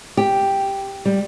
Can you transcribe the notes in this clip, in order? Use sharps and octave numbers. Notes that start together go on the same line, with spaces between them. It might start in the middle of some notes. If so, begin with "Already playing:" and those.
G4
G3